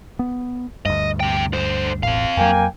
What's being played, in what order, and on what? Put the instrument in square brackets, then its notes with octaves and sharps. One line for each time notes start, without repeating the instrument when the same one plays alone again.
[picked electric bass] B3
[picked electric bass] D2 G2 [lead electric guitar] D#5
[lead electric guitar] C3 G5
D3 C5
[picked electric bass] E1 A1 A2 [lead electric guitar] C4 F5
[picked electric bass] F2 F#3 [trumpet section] A#3 G5 G#5